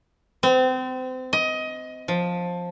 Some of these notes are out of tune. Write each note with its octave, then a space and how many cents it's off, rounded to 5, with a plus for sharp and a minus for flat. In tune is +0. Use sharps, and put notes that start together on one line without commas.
C4 -30
D#5 +20
F3 +15